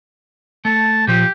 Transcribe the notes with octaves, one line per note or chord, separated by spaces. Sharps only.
A3 A5
A#2 F3 G4